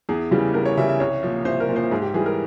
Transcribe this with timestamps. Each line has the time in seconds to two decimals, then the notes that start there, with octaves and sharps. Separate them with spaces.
0.09 E2 G#4
0.31 C#3 E3 G3
0.54 E2 A#4
0.65 C#5
0.77 C#3 E3 G3 E5
0.88 E5
1.00 C2 C#5
1.23 A#2 F3
1.45 C2 C5
1.60 A#4
1.69 A#2 F3
1.76 C5
1.91 G#2 G#4
2.02 G4
2.14 E3 G#4
2.18 G3
2.26 A#4